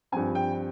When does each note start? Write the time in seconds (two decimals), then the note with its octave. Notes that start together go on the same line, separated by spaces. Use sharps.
0.12 G2 F3 C4 G#5
0.35 G5